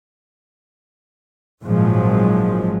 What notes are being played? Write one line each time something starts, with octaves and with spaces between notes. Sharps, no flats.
G#1 A#2 F3 F#3 G#3